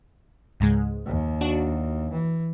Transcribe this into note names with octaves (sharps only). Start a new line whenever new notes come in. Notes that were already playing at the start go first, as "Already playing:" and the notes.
C#2 G#2 G#3
D#2
D4 F#4
E3